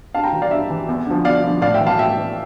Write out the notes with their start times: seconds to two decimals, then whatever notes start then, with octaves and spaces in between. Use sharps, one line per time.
0.14 G2 F5 A5
0.23 G5 A#5
0.32 E3
0.42 D5 F5
0.51 G2 E5
0.70 E3
0.88 E2
1.07 D3 F3
1.25 E2 D5 F5
1.44 D3 F3
1.61 A2 D5 F5
1.74 E5 G5
1.81 E3
1.87 F5 A5
1.99 A2 E5 G5
2.17 E3